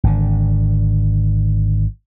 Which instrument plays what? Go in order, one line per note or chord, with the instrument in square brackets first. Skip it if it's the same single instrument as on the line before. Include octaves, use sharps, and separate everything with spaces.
[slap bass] G#1 D3